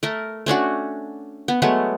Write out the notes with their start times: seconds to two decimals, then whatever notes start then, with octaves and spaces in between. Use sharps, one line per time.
0.03 A3 A#4
0.46 A3 C#4 D4 F#4
1.48 B3
1.62 F#3 G#3 A3 B3